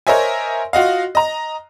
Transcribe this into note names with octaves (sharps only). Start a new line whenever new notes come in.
A#4 C5 C#5 D#5 E5 G#5
F4 F#4 D#5 F5
D#5 A#5